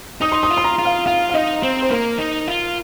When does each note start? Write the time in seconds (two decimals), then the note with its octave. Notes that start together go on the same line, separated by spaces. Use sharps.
0.21 D#4 D#6
0.32 C6
0.43 D#6
0.50 F4
0.57 C6
0.64 A#5
0.79 F4
0.85 F5
1.06 F4 F5
1.29 F5
1.34 D#4 D#5
1.63 C4 C5
1.82 C5
1.90 A#3 A#4
2.18 D#4
2.48 F4